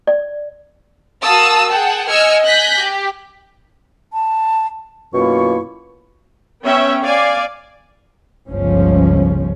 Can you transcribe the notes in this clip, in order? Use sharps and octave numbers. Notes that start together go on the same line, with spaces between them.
D5
F#4 A#4 F5 A5 D#6 E6
G#4 F#5 G5 A5
D#5 G#5 E6 F6 G#6 C#7
G#5 F#6 G6 A#6 B6
G4
A5
F#2 B2 A#3 E4 F4 C#6
B3 C#4 C#5 E5 G5
D5 F5 G#5
G1 C#2 F3 C#4